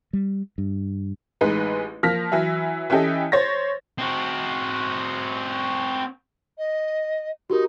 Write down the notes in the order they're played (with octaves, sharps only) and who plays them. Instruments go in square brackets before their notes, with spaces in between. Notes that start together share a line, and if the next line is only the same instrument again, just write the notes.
[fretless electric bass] G3
G2
[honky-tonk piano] A1 G#3 D#4 B4
F3 A#3 F6 A#6 B6
E3 F#3 E5
E3 C#4 E4 G4 A4 D#5
C5 C#5 A6 A#6
[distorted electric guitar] C4 F#4
[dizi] D#5
[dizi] D#4 [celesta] F#4 G4 A#4